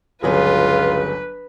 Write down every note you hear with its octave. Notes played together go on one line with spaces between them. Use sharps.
G1 C#2 F#3 F4 G#4 B4